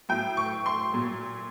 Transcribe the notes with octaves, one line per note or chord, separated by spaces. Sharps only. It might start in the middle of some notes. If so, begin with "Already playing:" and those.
A2 F#3 G5
C#6
C6
A#2 F#3